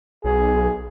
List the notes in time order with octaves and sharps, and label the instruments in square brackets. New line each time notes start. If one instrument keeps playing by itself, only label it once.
[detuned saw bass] B1 [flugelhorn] G#4